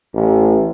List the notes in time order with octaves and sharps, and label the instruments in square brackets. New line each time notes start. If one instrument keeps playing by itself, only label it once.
[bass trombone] A1